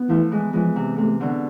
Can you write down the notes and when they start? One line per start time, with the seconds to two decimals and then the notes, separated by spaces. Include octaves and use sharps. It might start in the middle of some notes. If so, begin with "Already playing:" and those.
Already playing: B3
0.09 E3 F3 A3
0.31 E3 G#3
0.53 E3 F3 G#3
0.76 C3
0.97 C3 A3
1.20 B2 D3